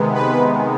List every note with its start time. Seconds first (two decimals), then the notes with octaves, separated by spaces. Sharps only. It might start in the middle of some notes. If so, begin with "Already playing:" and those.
Already playing: C3 D#3 G#3 B3
0.14 B4